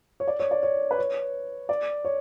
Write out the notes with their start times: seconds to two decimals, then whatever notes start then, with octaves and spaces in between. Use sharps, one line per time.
0.20 C#5
0.28 D5
0.40 C#5
0.51 D5
0.63 C#5
0.91 B4
0.99 C#5
1.69 D5
2.05 C#5